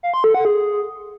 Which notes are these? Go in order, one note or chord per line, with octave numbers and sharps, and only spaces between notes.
F5
C6
A4
F#5
G#4